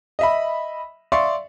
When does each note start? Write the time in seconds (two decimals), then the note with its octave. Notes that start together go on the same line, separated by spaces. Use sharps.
0.19 D#5 E5 B5
1.12 D5 E5 F5 C6 C#6